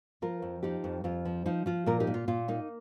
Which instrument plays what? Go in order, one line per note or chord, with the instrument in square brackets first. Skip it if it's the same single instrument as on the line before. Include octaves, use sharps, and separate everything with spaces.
[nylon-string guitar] F3 F4 A#4
F2
F3 D#4 G4
F2
F2 F4
F3
F3 D#4
F3 F4
A#2 F4 A#4
D#4 G4
A#2
F4
A#2 F4
A#3 D#4